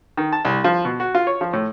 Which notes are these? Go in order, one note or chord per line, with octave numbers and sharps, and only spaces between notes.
D#3
A5
C2
F3
B2
F#4
F4
C#5
F3
A2